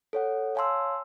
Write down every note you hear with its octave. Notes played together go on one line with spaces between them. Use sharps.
A4 C#5 F#5
C#5 F5 G#5 A5 C6 E6